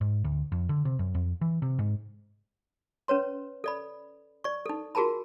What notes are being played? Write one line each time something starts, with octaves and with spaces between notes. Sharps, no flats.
G#2
D2
F2
D3
C3
F#2
F2
E3
C3
G#2
C#4 B4 C#5 C6
A4 D5 B5
D5 C#6
D#4 A4
F4 F#4 G#4 A#4 A5 B5